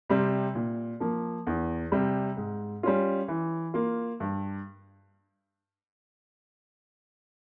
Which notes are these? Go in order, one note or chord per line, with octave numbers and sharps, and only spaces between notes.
C3 G3 C4
A#2
F3 A#3
E2
C3 G3
G#2
G3 C#4 F4
E3
A#3 F4
G2